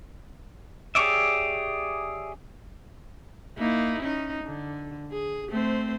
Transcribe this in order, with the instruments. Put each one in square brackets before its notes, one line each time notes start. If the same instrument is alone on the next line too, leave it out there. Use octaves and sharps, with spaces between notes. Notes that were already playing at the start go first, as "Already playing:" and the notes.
[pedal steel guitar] G4 G#4 C#5 D5 E5
[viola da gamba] A#3 D#4 E4
C#4 D#4
D3
G#4
A3 C4 C5